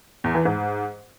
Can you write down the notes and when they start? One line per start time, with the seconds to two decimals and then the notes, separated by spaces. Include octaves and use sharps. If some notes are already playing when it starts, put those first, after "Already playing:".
0.24 E2
0.35 E3
0.45 G#2